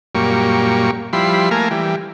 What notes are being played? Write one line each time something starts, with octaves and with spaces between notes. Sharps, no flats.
F#2 A#2 G3 A#3 C#6
F3 G3 E4 B5 C6
A3 A#3 A#4 F5 G#5
E3 G3